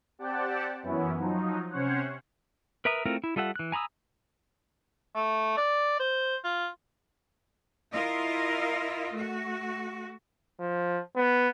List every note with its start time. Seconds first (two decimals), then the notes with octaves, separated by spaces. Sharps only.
0.19 C4 G4 D5 F#5 G5 A5
0.83 F#2 E3 B3 C#4 E4
1.18 F3 F#3 D#4
1.70 C3 C#4 C5 C#5 F#5
2.85 A#4 B4 E5 A#5 D#6
3.06 A3 C4 E4 F4 A#4
3.24 E4
3.36 G3 F4 A4 E5 F#5
3.56 E3 F#6
3.72 G#5 A#5 B5 D#6 E6
5.15 A3
5.58 D5
6.00 C5
6.44 F4
7.92 E4 F4 A#4 D#5 F5
9.13 A3 F#4
10.60 F3
11.16 B3